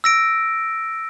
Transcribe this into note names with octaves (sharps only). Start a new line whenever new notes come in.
E6 A#6 D7